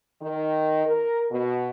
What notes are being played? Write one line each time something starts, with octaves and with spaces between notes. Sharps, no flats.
D#3
A#4
B2